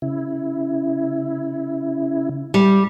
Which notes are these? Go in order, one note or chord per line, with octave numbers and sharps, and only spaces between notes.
C#3 E4
G3